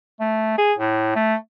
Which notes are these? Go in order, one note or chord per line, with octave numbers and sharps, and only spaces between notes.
A3
G#4
A2
A3